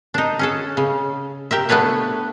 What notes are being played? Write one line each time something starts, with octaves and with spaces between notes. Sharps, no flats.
D4 D#4
C#4 G#4 A4
C#3
G4 A#4 E5
A3 B3 D4 B4 C#5